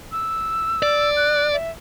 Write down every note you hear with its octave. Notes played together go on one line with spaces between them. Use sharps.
E6
D5
F#6
E5